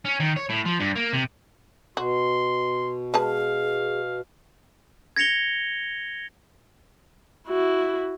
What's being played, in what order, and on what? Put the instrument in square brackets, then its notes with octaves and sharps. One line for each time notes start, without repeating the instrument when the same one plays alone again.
[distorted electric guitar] C#4
D#3
C#5
A2
F3
G2
A#3
C3
[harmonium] B2 [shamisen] F#4 [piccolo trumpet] C6
[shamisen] G#3 B4 A5 [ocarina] G#4 [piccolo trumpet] F5
[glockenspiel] G#6 A#6 C#7 F7 G7
[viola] E4 F#4